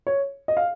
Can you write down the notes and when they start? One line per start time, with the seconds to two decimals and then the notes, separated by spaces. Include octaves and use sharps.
0.07 C#5
0.48 D#5
0.57 F5